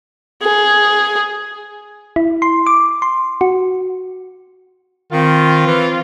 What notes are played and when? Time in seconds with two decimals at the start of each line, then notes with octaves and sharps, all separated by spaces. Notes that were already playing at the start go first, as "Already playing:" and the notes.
0.43 G#4
2.16 E4
2.42 C6
2.67 D6
3.02 C6
3.41 F#4
5.12 D#3 C4 F4
5.67 E3